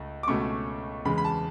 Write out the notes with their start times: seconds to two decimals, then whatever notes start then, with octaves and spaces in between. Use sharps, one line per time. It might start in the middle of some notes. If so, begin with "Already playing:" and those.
Already playing: C#2 A3
0.23 D6
0.28 C#2 B2 A3 C#4 C#6
1.05 E2 C#3 G#3 B5
1.18 B5
1.24 A5